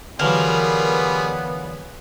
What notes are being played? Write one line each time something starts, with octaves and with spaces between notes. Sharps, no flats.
D3 E3 F#3 G3 B3 F4 G#4 A#4